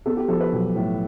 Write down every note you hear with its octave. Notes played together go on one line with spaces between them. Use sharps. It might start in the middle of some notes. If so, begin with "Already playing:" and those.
B3 A4
G4
F3 A4
B4
B1
A2